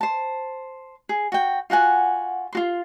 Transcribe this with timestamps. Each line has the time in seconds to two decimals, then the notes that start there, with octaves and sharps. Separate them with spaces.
0.01 C5 A5
1.09 G#4
1.32 F#4 G5
1.70 F4 F#4 F#5 G#5
2.53 F4 F#4 C6